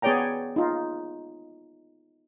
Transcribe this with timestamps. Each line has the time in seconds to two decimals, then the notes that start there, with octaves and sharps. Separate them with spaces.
0.02 B3 G#4 C#5 D5 G5 A#5
0.56 D#4 F4